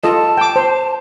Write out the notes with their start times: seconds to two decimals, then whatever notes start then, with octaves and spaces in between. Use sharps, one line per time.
0.04 F4 A4 D#5 A5
0.37 G5 D6
0.56 C5